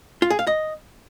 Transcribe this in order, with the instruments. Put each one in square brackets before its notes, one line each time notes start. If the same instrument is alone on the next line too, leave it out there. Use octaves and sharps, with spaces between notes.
[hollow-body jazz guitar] F4
G#4
F5
D#5